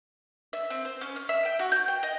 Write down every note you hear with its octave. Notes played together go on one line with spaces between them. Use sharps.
E5
C4
C5
C#4
F6
E5
G5
F#4
G6
G5
D#5